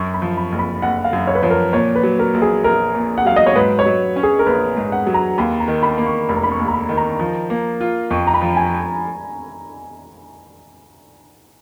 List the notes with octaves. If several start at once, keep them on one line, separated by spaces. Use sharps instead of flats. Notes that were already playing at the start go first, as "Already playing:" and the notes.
Already playing: F#2 C#6
B5
F3
B5
F#1
B5
F#1 F#5
F5
F#2
C#5
B4
F3 C#5
A#4
A#2 C#5
B4
F#3
A#4
A#1
G#4
A#1 A#4
A#2
F#5
F#3 F5
D#5
C#5
G#2 B4
C#5
F#3
C#4
G#4
A#4
A#1 B4
G#2
F#5
F#3
A#5
D#2 B5
A#5
D#3
B5
A#3
C#6
F1 B5
A#5
B5
C#6
D#2
A#5
B5
D#3
A#5
F3
A#3
F4
F2 C#6
A#5
B5
F3
G#5